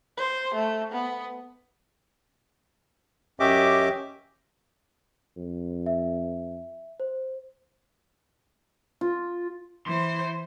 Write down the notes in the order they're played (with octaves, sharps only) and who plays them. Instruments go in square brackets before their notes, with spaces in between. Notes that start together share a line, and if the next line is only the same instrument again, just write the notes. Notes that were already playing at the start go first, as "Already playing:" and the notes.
[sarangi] C5
A3
B3
[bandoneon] F#2 C#4 G4 D#5 E5 D6
[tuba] F2
[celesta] E5
C5
[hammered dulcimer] F4
[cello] E3 C5 [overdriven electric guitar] C6